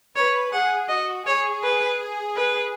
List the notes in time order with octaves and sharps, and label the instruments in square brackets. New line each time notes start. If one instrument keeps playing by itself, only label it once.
[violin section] B4 [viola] C#5
[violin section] G#4 [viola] F#5
[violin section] F#4 [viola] D#5
[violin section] G#4 [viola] C#5
[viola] B4
B4